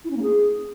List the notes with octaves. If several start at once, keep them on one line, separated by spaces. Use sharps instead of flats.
E4
C#4
A#3
G#4